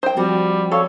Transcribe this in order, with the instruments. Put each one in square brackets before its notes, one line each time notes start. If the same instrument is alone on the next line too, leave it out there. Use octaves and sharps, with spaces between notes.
[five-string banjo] C5 G5
[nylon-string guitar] F3 C4 F#4 [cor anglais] G3
[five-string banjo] A4 F5 [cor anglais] C#5